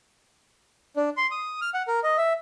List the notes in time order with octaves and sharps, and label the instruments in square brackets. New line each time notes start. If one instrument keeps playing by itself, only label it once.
[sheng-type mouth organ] D4
C6
D#6
F6
F#5
A#4
D#5
E5